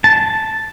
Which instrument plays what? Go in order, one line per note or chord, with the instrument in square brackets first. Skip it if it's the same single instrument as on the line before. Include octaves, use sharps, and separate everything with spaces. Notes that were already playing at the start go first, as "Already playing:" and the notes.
[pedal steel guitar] A5